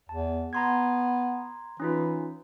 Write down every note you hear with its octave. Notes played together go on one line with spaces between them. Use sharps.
E2 A5
B3 A#5 C6 G#6
E3 C#4 D#4 F4